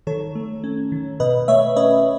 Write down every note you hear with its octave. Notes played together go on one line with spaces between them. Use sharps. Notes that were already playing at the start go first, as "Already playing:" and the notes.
D#3 A4 C#5
A3
C#4
D#3
B2 B4 D#5
A3 C#5 E5
C#4 B4 D#5